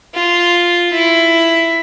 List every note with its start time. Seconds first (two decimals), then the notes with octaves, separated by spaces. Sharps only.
0.14 F4
0.93 E4